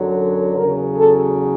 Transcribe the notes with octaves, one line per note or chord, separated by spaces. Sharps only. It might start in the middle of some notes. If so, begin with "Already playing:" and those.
Already playing: F#2 D3 F#3
E2 C#3 F#3 A#4
A4